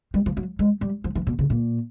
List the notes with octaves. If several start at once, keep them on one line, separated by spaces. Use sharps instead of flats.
G3
F3
F#3
G#3
G3
F3
E3
B2
C#3
A#2